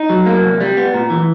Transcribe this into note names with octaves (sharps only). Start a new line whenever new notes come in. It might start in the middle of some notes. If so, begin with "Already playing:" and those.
Already playing: D#4
F#3
A#3
C2
G3
B3
A#2
E3